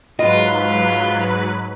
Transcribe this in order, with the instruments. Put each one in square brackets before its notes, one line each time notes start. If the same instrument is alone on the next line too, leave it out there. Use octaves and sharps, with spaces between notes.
[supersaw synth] G#2 F#3 B4 [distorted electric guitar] F4 [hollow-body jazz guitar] D#5